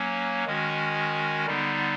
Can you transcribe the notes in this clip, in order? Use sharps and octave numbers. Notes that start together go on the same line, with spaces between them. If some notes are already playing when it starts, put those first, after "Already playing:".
Already playing: F#3 A#3 C#4
D#3 G#3 C#4 F#4
D3 G3 B3 D#4